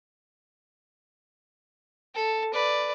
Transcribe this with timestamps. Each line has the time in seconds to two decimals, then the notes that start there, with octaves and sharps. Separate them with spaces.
2.15 A4
2.53 B4 D5